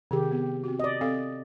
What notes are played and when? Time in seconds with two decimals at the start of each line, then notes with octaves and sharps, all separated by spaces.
0.11 C3 D#3 G4 G#4
0.31 B3
0.64 C4 F#4
0.80 D5 D#5
1.01 C4 A4 F5